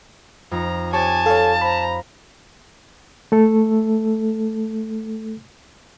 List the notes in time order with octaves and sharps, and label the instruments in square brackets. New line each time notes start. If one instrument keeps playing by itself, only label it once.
[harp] F2 D#4 [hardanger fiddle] A#5
[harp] G4 C#5 [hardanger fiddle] G#5 [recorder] A5
[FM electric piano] A4 C#5 [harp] F5
[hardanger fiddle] C5 A#5 [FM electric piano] B5
[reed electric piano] A3 A4